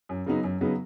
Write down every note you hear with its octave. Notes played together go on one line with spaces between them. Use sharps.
F#2
C#3 F#3 B3 D#4
F#2
C#3 F#3 B3 D#4